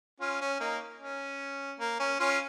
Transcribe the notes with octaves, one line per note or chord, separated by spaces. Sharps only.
C#4 F4
C#4
A#3 D#4
C#4
A#3
C#4
C#4 F4